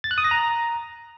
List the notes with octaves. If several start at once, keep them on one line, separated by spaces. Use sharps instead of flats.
A6
F#6
D#6
A#6
A#5